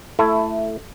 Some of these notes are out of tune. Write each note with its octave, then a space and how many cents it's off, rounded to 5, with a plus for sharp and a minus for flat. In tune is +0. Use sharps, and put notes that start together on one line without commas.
A3 +0 E4 +15 A4 +0